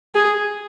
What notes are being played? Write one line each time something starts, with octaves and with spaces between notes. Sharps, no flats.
G#4